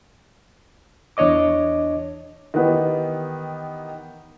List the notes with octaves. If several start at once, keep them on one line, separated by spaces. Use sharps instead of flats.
E2 D4 C#5 D#5 D6
D#3 E3 B3 D#4 G4